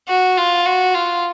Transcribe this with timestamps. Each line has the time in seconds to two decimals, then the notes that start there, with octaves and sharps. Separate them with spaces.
0.08 F#4
0.37 F4
0.66 F#4
0.95 F4